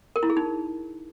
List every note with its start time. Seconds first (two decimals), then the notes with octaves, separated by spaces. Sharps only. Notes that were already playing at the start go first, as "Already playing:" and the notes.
0.16 A#4
0.23 E4
0.30 G#4
0.37 D#4